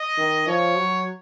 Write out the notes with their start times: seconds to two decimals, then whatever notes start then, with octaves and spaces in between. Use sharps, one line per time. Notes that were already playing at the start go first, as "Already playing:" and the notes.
Already playing: D#5
0.18 D#3
0.47 F3 C#5
0.76 F#3